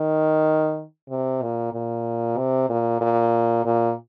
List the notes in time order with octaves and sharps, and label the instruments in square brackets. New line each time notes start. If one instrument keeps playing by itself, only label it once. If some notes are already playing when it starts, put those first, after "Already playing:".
Already playing: [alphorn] D#3
C3
A#2
A#2
C3
A#2
A#2
A#2